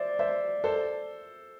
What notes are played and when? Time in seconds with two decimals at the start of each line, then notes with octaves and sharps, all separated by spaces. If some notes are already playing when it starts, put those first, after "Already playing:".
Already playing: C5 D5 E5
0.19 C5 E5
0.64 A4 C5